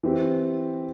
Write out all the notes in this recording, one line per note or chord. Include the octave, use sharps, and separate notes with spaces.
E3 C4 G4